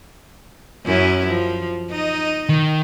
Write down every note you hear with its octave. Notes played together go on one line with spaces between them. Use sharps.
F#2 C#4 E4
F3
D#4 D#5
D#3